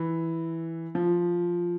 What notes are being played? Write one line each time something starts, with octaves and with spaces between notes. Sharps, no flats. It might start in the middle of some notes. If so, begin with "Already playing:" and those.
Already playing: E3
F3